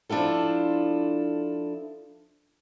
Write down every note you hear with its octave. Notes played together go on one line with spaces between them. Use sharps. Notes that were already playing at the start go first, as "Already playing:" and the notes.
F3 D4 E4 F4 A4